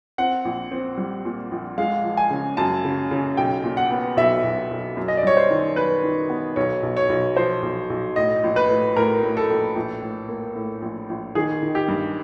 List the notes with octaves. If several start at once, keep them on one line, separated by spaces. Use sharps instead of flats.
C4 F#5
A#1
C4
G3
A#2
A#1
G#3 F5
F3
G#5
C#3
F#2 A5
C#3
C#3
B1 G5
A#2
F#5
B3
B1 E5
B1
B1
F#2
D#5
D5
G3 C#5
C5
D#3
F#2 B4
D#3
B3
B1 C#5
B1
C#5
B1
F3 C5
B1
B1
A2 D#5
A#1
B4
A2
A2 A#4
A2
A4
A#1
A#1
A2
A#3
A2
A#1
A#1
D#3 G#4
D#3
G4
G2